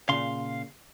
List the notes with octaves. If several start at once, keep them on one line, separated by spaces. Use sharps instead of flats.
A#2 C#3 F5 C6